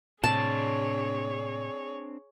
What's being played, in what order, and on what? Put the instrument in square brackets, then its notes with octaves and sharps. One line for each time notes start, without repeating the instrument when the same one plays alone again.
[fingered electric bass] A2 C3 [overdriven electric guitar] C4 D4 [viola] G#4 C#5 [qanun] A5